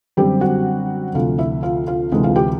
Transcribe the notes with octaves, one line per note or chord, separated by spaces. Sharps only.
F#2 D3 G3 C4 G4 G5
F#4 F#5
D2 C3 F3 A3 F4 F5
E4 E5
F4 F5
F4 F5
D2 C3 E3 G#3
F4 F5
G4 G5